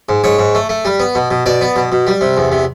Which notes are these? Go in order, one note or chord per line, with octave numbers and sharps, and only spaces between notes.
G#2
G#2 C#5
G#2
A3
A3
G3
B3
B2
B2
B2 D5
B3
B2
B2
G3
C3
E2
C3